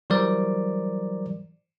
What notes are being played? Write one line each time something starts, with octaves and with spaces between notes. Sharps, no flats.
E3 F#3 G3 A#4 C5 D5